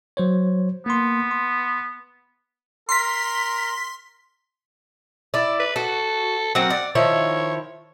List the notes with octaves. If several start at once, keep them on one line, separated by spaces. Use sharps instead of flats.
F#3 C5 C#5
A#3 B3 C6
C6
A#4 C6 B6
E4 D5
B4
F#4 A4
F#3 A#3 C4 F#5
D5
D#3 F3 E4 C#5